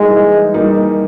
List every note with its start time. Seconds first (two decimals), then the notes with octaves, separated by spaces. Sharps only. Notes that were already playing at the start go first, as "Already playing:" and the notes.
Already playing: G3 G#3 A#3 D#4
0.10 E3
0.54 G3 A#3 D#4